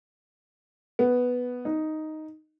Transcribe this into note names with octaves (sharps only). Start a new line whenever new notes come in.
B3
D#4